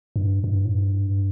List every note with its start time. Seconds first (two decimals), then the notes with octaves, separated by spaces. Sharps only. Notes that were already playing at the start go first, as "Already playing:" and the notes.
0.16 G2
0.44 G2
0.65 A2
0.71 G2